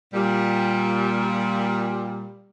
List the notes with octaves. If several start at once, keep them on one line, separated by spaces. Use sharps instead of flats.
A#2 G3